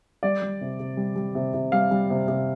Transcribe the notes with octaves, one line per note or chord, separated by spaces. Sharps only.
G3 D5
G3
C3
C3
G3
G3
C3
C3
G3 F5
G3
C3
C3